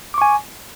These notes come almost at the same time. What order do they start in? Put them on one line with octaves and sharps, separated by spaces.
D6 C#6 G#5